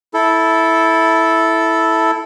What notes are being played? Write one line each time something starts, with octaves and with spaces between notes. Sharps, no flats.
E4 A4